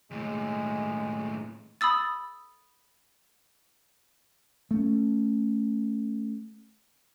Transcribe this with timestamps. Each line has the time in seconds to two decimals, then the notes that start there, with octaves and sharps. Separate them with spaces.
0.11 D#2 A2 G#3
1.81 B5 D#6 E6 A6
4.71 A3 C#4